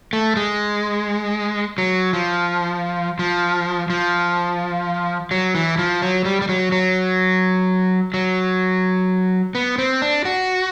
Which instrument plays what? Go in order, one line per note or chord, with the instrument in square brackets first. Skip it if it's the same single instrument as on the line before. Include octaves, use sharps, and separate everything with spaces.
[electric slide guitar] A3
G#3
F#3
F3
F3
F3
F#3
E3
F3
F#3
G3
G3
F#3
F#3
F#3
B3
C4
D4
F#4